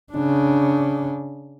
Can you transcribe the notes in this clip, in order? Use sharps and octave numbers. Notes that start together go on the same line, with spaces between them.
C#3 D4